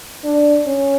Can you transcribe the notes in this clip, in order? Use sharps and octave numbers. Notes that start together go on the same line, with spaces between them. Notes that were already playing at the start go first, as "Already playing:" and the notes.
D4
C#4